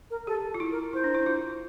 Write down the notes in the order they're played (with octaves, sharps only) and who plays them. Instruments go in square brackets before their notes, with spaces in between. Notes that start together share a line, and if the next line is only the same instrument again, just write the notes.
[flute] A#4
[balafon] G4 [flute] A4
[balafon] F4
E4
[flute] A#4
[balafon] E4 [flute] C5
[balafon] D4
E4
F4